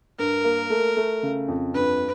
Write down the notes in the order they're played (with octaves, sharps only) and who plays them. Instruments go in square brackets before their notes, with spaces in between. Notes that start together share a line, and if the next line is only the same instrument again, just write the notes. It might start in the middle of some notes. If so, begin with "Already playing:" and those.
[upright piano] G2 [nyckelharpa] A#4
[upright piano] A#3
A3
A3
C#3
F2
[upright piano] G2 [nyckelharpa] B4